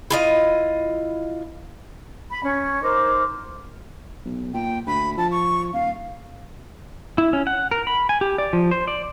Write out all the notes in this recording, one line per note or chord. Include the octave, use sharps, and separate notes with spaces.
E4 F4 D#5
B5
C#4 C#5
D#4 A#4 C5 D6
B1
A#2 G5
D2 B5
F3 A5
C#6
D#1 F5
E4
C#4
F#5
A#4
B5
G#5
G4
D5
F3
C5
D5